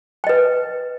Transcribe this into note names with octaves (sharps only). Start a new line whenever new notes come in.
B4 D#5 G5